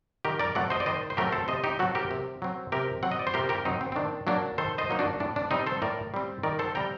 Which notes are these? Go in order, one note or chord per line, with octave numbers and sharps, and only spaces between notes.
D#3 G4 A#4
A#4 D5
F#3 A3 C4 D5 F#5
C5 D#5
D5
D#3 C5 D#5
C5
F#3 A3 C4 G4 A#4
A4 C5
C3 C5 D#5
D#4 G4
F#3 C4 F#4 A4
G4 A#4
C3
F#3 C4
C3 G4 A#4
F#3 C4 F#5
D#5
D5
C5
C3 G4 A#4
G4 A#4
F#3 C4 D#4
C4
C4
D#3 D4
F#3 A#3 D4
D#3 A4 C5
C5 D#5
F#3 A#3 D#4
D4 F#4
A2 D4
D4
G3 C4 D#4
A4 C5
A2 A#4 D5
G3 C4
D#3 A#4 D5
A4 C5
G3 C4 G5 A#5